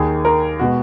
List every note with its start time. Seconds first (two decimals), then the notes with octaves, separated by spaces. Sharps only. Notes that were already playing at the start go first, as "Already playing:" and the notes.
Already playing: D#2 D#3 A#3 G#4
0.25 A#4
0.59 B2 G#3 B3 F#4